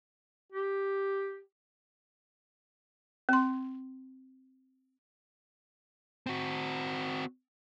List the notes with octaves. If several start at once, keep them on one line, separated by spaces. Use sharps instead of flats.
G4
C4 C6
C4 F#4